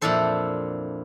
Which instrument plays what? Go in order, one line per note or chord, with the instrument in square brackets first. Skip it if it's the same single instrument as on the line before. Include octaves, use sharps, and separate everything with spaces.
[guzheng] F2 A#2 D4 E4 A4 C5